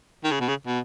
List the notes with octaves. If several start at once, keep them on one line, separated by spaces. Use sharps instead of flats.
D#3
C#3
B2
C#3
B2